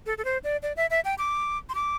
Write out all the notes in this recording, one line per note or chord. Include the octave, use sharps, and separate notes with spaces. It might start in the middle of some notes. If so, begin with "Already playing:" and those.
A4
A4
C5
D5
D5
E5
E5
G5
D6
C6
D6